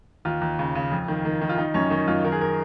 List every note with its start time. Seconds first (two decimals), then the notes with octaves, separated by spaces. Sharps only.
0.25 D#2 F4
0.41 D#2
0.59 C#3
0.75 C#3
0.92 F2
1.08 D#3
1.25 D#3
1.41 D#3
1.49 F4
1.57 D#3 D#4
1.74 F#2 C#4
1.90 D#3 D#4
2.07 F#2 F4
2.24 D#3 A#4
2.32 G#4
2.41 A#4